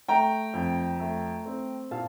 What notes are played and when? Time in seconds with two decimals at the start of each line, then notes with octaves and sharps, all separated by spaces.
0.08 A3 G5 A#5
0.54 F2
1.00 A3
1.46 C4
1.91 A#2 F5 A5